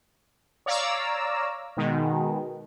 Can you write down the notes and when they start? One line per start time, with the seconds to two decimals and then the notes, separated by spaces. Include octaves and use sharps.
0.66 C#5 D5 F5 A#5 D6 E6
1.77 B2 D#3 G#3